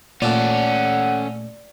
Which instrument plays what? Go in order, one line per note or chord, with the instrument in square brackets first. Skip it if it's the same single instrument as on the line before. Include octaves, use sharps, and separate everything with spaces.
[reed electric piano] A#2 A3 [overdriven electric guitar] C#4 A4 [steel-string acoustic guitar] D5 [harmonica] F#5